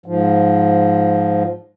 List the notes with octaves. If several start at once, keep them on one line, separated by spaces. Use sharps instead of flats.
G#2 F3